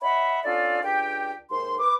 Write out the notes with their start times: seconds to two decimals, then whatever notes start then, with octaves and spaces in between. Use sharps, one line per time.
0.01 C#5 D#5 E5 F#5 B5
0.45 C#4 D4 F4 A4 D5
0.83 C#2 D4 G4 G5
1.51 D#2 G#2 C6
1.80 B4 D6